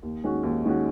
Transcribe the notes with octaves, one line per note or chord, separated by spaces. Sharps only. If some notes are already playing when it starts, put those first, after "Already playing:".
D#2
D#3 G#3 C#4 F#4
D#2
D#3 G#3 C#4 F#4